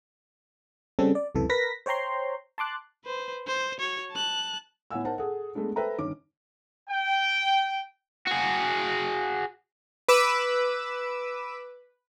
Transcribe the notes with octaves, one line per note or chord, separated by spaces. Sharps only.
C#3 G3 C4 C#4 A4
D5
C#2 F#2 C3 E3 A4
A#4 B4 A#6 B6
C5 C#5 G5 A#5 C6
A5 C6 D6 F#6
B4 C5
C5
F#4 C#5
A5 F#6
A2 B3 C#5 F#5 G#5 E6
D#4 A#4 C5 F#5 A5
G#4 A4 F#5
G#3 A3 B3 D4
A4 B4 C5 E5 G5 A#5
G1 D#3 C#4 D6
G5
F#4 G#4
B4 D6 E6